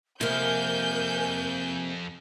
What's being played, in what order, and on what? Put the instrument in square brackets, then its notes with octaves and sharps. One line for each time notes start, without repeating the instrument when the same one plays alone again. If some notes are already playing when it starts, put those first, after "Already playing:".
[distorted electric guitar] C2 F2 [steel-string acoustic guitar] C3 A#3 [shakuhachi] A#4 [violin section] G#5 G6